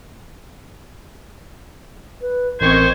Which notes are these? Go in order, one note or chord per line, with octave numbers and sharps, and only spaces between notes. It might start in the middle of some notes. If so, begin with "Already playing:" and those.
B4
A1 C4 A#4 C5 D#5 C#6 G#6